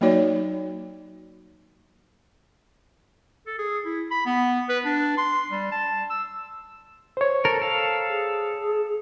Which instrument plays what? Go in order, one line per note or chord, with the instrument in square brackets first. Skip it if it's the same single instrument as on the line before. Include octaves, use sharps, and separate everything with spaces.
[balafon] F#3 A#3 D#4 F#4 C#5 D5
[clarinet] A4
G#4
E4
B5
B3
B4
D4
C6
G3
A5
E6
[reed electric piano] C5 C#5
[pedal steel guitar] A4 A#4
A4 F5
[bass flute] G#4